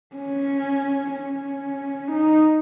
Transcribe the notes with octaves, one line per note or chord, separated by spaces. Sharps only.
C#4
C#4
D#4